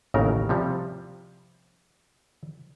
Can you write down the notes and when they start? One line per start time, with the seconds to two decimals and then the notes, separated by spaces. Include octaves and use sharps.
0.14 A1 D#2 C#3 A#4
0.49 C3 F3 G3